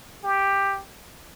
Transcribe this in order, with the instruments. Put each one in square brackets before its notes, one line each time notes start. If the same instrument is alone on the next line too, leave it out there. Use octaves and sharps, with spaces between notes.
[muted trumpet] G4